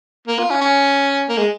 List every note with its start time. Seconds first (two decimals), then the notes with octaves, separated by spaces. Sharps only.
0.27 A#3
0.39 F4
0.50 C#4
0.61 C#4
1.29 A#3
1.37 G#3